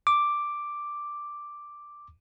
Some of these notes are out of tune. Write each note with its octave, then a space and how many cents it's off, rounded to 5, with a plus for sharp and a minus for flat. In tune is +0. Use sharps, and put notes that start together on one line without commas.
D6 +0